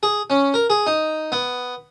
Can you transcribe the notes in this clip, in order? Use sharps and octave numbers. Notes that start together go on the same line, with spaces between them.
G#4
C#4
A#4
G#4
D#4
B3